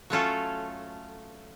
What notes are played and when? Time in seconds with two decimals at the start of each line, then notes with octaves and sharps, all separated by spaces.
0.10 F#3 A3 C#4 F4 A4